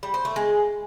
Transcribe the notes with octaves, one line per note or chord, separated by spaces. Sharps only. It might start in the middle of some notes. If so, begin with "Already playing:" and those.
G3
C5
A3
G#3